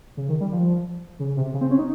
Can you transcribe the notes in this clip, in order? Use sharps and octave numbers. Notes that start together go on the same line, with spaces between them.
C#3
D#3
G3
F3
C#3
C3
C#3
C4
C#4
D#4